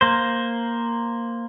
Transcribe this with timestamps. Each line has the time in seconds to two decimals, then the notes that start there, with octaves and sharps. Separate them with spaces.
0.01 A#3 C5